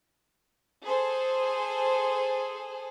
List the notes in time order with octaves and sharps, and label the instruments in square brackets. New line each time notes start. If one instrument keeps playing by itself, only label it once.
[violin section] G#4 A4 C5